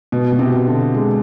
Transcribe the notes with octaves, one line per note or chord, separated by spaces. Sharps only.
B2
B2
C3
D3
G#3